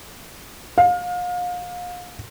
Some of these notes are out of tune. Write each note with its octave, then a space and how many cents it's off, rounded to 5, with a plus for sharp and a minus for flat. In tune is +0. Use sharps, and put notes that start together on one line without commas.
F5 +35